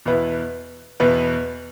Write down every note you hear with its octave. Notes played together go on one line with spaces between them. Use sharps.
E2 B2 B3 E4 B4
E2 B2 B3 E4 B4